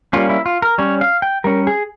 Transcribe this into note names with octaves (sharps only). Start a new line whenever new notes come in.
G3 A#3 C#4 F4
E4
F4
A#4
G3 C#4 C#5
F5
G5
G3 C#4 A#4
G#4